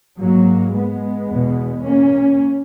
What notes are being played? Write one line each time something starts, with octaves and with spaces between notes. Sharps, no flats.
G#2 F#3 A#3
G#3 B3
E2 B2
A#3 C#4